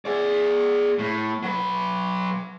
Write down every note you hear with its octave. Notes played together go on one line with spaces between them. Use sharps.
G#4 D5
A2
F#3 B4